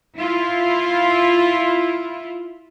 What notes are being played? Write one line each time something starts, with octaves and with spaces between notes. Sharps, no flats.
E4 F4